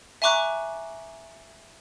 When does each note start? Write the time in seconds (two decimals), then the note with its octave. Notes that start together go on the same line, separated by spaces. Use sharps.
0.22 E5 G#5 A#5 C#6 D6 F#6